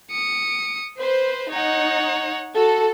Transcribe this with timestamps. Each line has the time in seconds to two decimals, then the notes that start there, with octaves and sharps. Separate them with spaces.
0.11 D#6 C#7
1.00 B4 C5
1.51 D#4 C#5 F#5
2.56 F#4 A4